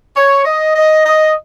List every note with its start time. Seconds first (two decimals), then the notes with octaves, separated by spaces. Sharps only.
0.15 C#5
0.45 D#5
0.75 D#5
1.06 D#5